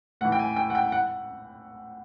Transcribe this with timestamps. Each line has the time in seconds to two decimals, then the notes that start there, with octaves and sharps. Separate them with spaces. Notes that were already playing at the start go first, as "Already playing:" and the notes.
0.21 A2 F#5
0.25 E3
0.32 G5
0.39 G#5
0.56 G5
0.70 F#5
0.75 G5
0.92 F#5